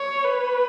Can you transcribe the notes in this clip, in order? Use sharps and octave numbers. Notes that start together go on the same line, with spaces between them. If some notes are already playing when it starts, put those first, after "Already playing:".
Already playing: C#5
B4